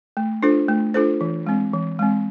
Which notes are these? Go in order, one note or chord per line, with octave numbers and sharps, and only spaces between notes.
A3
D4 F4 A4 C5
A3
D4 F4 A4 C5
E3
G#3 C4
E3
G#3 C4